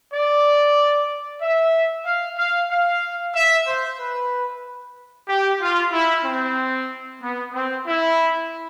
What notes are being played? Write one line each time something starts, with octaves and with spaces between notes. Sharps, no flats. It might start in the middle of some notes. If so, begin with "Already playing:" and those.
D5
E5
F5
F5
F5
E5
C5
B4
G4
F4
E4
C4
B3
C4
E4